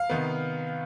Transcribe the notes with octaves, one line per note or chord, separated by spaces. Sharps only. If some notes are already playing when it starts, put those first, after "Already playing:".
Already playing: F5
C3 D#3 B3